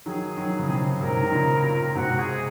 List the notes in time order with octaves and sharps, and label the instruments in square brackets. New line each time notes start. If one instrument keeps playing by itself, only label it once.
[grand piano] D#3 F#3 [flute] G#4
[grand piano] D#3 F#3
C#3
C3 D#3
[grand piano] G#2 C3 [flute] A#4
[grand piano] D#3
A#2 C#3
A#2
[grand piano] G#2 C3 [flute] F#4
[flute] G#4